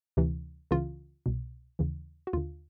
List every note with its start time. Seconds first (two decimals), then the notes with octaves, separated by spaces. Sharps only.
0.17 D2 C3 E3
0.71 C#2 C#3 E3 F4
1.26 C2 B2
1.79 D#2 C#3 E3
2.27 F#4
2.33 D#2 D3 F4